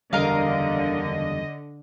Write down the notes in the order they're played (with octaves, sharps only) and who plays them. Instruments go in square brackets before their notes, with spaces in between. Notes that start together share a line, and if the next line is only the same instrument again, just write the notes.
[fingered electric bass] F#1 E2 G3 [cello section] D3 [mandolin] A#4 F5 [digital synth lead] D#5